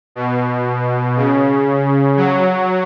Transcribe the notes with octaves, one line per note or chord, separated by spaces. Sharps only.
B2
C#3
F#3